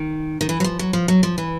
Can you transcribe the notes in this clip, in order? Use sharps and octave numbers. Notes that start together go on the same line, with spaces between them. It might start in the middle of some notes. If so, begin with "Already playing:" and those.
Already playing: D#3
D#3
E3
F#3
F3
F#3
F3
F#3
F3
E3